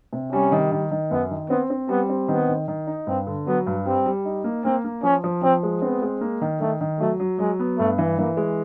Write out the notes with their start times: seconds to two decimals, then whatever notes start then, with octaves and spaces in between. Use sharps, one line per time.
0.13 C3
0.33 G3 C#4
0.52 D#3
0.72 D#3
0.91 D#3
1.11 F#2 B3
1.31 D#3
1.50 B3 C4
1.70 C4
1.89 G3 B3
2.09 C4
2.28 D#3 B3
2.48 D#3
2.68 D#3
2.87 D#4
3.07 G2 C4
3.27 D3
3.47 F#3 B3
3.67 G2
3.86 G3 C4
4.06 G3
4.25 D#4
4.44 A#3
4.64 A#3 C4
4.84 A#3
5.03 F3 C#4
5.24 F3
5.42 F3 C4
5.63 G#3
5.82 B3 C4
6.02 G#3
6.21 A#3
6.41 D#3
6.60 D#3 A3
6.81 D#3
7.00 F#3 A3
7.20 F#3
7.39 F#3 G#3
7.59 B3
7.78 G2 A3
7.98 E3
8.18 E3 A#3
8.37 G#3